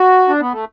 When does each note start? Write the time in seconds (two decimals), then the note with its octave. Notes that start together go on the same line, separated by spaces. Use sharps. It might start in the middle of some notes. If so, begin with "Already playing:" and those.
Already playing: F#4
0.28 D4
0.40 B3
0.53 A3